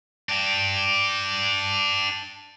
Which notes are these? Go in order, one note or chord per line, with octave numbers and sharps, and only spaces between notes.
D4 G4